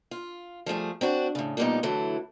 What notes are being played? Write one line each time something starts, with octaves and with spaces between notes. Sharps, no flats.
F4
F3 G3 A3 G#4
C4 D4 F#4
A2 C#3
F2 A#2 G3 G#3 B3 D#4
D3 E3 F#3 A3 E4